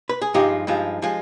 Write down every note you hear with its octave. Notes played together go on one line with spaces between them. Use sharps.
B4
G#4
G2 F3 G#3 D#4 G4
G2 F3 G#3
F3 G#3